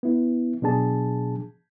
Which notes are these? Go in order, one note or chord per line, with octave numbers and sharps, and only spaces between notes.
B3 E4
B2 F#3 D4 G#4 A5